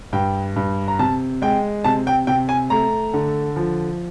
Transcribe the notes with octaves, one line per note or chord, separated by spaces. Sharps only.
G2 G5
G2
A#5
C3 A5
G#3 G5
C3 A5
G5
C3 G5
G#5
A3 A#5
D3
F3